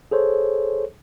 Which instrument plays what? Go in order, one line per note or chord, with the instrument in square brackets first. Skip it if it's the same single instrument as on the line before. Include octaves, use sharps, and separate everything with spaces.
[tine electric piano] G#4 A4 C5 C#5